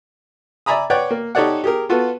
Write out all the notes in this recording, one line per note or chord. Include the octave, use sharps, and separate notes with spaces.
D5 E5 G#5 A#5 B5 D#6
B4 C#5 D5 F#5 G5
A#3
D#4 G4 A4 C#5 D5 F#5
G4 G#4 A#4
B3 F4 F#4 A4 B4